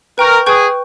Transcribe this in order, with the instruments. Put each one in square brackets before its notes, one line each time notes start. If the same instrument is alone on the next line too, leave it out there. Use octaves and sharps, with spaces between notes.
[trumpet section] A#4 [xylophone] B4 G5 C#6 G6
[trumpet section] G#4 [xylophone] B4 G5 C#6 G6